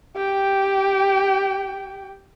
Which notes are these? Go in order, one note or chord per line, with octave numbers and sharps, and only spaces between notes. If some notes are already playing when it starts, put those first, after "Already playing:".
G4 G5